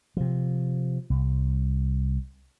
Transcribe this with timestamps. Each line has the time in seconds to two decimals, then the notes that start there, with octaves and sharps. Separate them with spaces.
0.17 C3 F3
1.10 C2